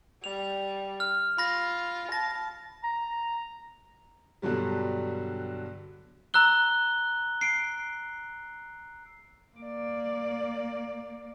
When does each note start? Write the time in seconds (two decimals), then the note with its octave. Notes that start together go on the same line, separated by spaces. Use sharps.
0.24 G3 F7
1.00 F6
1.38 F4 B5 A#6
2.12 A5 A#6
2.83 A#5
4.42 G2 B2 D3 F#3 G3
6.34 A#5 E6 F#6 G7
7.41 C7 D7
9.57 A#3 D5